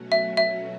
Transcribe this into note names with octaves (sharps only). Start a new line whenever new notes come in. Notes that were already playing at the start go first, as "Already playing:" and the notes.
Already playing: B2 F#3 A3 C#4 F#4
E5
E5